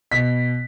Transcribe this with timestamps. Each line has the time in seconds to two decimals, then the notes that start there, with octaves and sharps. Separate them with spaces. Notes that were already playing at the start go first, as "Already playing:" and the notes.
0.11 B2 B6